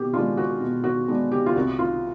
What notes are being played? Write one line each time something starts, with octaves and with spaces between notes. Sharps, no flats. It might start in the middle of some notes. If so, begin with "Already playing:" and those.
Already playing: B2 G4
G#3 B3 D4 F4
F#4
B2
F#4
G#3 B3 D4
G4
F4
C2 F#4
F4